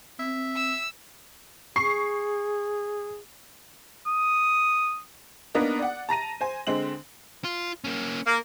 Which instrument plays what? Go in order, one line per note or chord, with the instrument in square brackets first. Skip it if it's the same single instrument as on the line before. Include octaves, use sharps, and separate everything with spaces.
[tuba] C4 [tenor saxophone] E5
[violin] E6
[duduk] G#4 [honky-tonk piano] C#6 C7
[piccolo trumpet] D#6
[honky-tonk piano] A#3 B3 D4 D#4 A#4
D5 F#5
A5 A#5 A#6 D#7
C5 G#5
D3 G#3 C4 F#7
[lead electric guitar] F4
A#3 C#4
[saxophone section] A#3